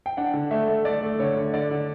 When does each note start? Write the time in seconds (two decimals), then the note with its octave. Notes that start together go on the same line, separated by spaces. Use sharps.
0.06 G5
0.17 D4 F#5
0.34 D3
0.51 A3 E5
0.68 A3
0.85 A3 D5
1.03 A3
1.19 D3 C#5
1.37 D3
1.54 D3 D5
1.71 D3